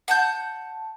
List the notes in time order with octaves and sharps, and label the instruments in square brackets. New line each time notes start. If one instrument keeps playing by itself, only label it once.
[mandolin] F#5 A5 G6